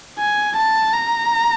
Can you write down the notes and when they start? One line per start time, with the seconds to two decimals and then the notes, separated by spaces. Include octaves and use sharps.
0.19 G#5
0.57 A5
0.94 A#5